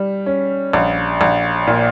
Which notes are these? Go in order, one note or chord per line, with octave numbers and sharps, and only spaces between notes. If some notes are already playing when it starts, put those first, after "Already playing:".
Already playing: G3
C#4
A#1
A#1
A#2